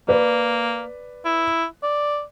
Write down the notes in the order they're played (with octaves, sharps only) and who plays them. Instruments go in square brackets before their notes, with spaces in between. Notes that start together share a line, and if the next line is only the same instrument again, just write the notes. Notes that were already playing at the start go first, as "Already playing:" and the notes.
[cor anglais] A#3 [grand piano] B4 D5
[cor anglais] E4
D5